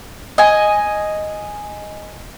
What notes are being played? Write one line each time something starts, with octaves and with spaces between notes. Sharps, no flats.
D#5 G#5